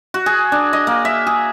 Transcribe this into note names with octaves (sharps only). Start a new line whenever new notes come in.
F#4
G#4
D4
D#5
A#3
E5
G#4